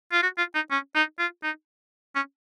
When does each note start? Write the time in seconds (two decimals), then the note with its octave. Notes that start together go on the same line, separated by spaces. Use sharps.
0.12 F4
0.22 F#4
0.38 F4
0.55 D#4
0.71 C#4
0.95 D#4
1.19 F4
1.43 D#4
2.15 C#4